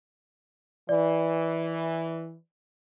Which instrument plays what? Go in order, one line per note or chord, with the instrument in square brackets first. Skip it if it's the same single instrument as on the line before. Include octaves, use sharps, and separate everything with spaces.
[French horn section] E3 [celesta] D5